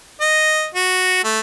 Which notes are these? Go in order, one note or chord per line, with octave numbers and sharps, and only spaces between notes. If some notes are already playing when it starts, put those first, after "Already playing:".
D#5
F#4
A3